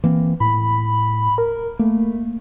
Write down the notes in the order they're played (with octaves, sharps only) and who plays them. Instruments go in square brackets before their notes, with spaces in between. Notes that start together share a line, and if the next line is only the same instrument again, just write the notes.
[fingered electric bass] E3 A#3 C4
[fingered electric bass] A2 [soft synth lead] B5
[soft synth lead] A#4
[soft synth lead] A3 [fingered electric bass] A#3